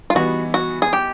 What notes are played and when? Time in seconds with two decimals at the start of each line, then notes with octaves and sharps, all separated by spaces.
0.10 F4
0.15 E3 G3 B3 D#4 F#4
0.54 F#4
0.82 G#4
0.93 G4